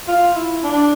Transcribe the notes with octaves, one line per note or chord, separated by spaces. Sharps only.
F4
E4
D4